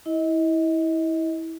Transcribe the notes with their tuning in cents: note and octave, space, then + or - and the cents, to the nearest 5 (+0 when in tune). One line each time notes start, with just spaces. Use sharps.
E4 -20 D#5 +30